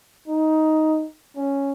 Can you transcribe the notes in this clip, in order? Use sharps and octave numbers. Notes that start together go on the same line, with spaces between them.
D#4
C#4